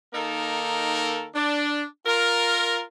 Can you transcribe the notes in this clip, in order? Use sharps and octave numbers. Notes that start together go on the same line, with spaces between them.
D#3 A#3 D#4 A4 A#4
D4
F4 A#4